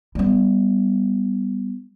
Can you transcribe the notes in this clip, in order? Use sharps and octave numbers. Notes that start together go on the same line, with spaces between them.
G3 B3